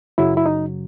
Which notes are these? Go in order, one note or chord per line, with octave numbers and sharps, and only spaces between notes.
F#2 C#3 F#3 E4
E4
D#4